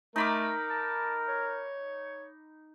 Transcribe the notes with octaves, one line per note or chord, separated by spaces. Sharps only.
A3 D#4 A#4 B5 D6
A5
C#5